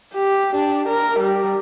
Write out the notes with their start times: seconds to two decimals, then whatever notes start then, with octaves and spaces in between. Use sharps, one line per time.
0.14 G4
0.56 D4
0.88 A#4
1.19 G3